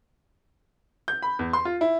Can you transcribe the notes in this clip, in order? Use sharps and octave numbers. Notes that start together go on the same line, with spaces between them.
G6
B5
E2
C6
F4
E4